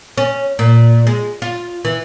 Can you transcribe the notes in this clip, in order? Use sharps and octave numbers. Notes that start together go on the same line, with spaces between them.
C#4
A#2
G#3
F4
E3